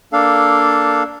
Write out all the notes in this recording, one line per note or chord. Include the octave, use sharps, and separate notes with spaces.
A#3 D4 A4 F5